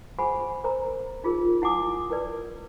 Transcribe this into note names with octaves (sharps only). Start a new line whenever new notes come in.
G#4 C5 F#5 G#5 B5
A#4 C5 A#5
D#4 F4 G#4 A#4
E4 F#5 G#5 D6 D#6
E4 A#4 B4 D5